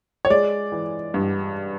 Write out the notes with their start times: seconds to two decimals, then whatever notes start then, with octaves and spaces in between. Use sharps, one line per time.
0.25 C#5
0.30 G#3 D5
0.72 E3
1.14 G2